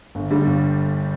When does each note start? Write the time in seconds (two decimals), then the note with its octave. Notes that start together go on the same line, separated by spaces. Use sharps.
0.15 G1
0.30 G2 D3 G3
0.46 G1